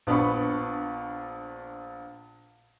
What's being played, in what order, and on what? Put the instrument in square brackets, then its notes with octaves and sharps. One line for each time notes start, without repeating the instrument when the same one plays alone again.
[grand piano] A#1 B3 D4 B5 C#6